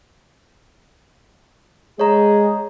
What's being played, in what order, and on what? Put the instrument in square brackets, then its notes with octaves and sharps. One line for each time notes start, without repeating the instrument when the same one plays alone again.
[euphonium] G#3 [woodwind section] G#4 [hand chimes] C#5 A#5